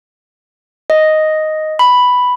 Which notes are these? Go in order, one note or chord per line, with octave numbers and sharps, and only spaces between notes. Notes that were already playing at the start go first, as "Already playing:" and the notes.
D#5
B5